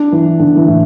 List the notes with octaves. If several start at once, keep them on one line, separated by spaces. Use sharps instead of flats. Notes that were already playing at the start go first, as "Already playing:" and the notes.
Already playing: D4
E3
D3
E3
A2